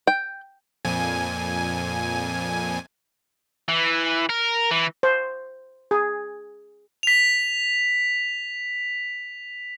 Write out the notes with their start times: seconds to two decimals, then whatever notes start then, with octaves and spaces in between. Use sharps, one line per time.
0.07 G5
0.85 F2 A#2 G#5
3.68 E3
4.29 A#4
4.71 E3
5.03 C5
5.91 G#4
7.03 B6 F7